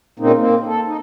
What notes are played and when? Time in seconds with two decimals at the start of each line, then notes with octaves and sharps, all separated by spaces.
0.19 A#2 C#3 A#3 C4 D#4
0.37 A#3 C4
0.66 A4
0.86 D#4